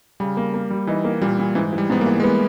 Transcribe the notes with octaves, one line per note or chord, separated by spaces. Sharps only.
C#3 G3
A#3
A#3
G3
E3 D#4
A#3
A#2 G3
A#2
G#2 E3
E3
G3
G#2 B3
A#3
E3
G#3
A#3 B3